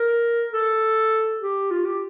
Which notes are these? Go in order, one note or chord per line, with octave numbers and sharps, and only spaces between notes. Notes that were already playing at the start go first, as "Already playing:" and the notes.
Already playing: A#4
A4
G4
F4
G4